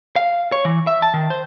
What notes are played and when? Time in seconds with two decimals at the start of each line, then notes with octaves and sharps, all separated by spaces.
0.16 F5
0.52 C#5
0.65 E3
0.87 E5
1.02 A5
1.14 D#3
1.30 C5